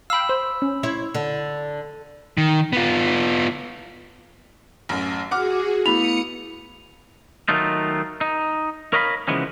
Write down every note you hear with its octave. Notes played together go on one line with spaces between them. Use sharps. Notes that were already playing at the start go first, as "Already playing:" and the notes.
F5 G5 B5 E6
C5
C#4
E4 C5 C#5
D3
D#3
B3 F4
A1 F#2
F#4 G#4 F#5 D6 F6
A3 B3 E4 B5 D#6 C#7 F7
D#3 F#3 A3 D#4 F4
D#4
A#4 C#5 D#5 F5 A#5 B5
C#3 E3 F3 G#3 B3 C#4